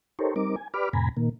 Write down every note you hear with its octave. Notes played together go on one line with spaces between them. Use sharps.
D#4 G4 A4 A#4 C5 C#5
G3 C4 D#4 A#4 D6
G#5
G4 B4 D5 B5 D6 F6
F2 A2 C3 G#5 A#5 B5
A#2 D#3 A#3